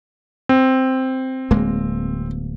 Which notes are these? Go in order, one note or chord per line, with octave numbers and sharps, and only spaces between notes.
C4
D1 G#3 A#3